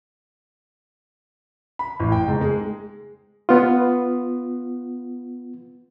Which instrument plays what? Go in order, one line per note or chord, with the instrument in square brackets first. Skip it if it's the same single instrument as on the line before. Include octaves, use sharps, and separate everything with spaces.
[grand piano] B5
A1
G5
G#2
G#3
[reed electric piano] B3 F4